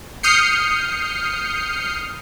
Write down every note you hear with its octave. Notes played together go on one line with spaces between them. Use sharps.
D#6 F6 G6 C7 C#7